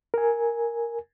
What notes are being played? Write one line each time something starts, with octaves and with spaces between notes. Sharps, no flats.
A#4 G#5